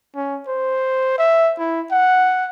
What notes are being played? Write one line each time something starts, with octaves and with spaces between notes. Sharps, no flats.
C#4
C5
E5
E4
F#5